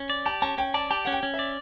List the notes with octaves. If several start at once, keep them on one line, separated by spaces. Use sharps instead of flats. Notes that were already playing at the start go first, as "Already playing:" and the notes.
Already playing: C#4
D5
G4 A5
C#4 A5
C#4 G5
D5 A5
G4 A5
C#4 F#5
G5
C#4
E5
D5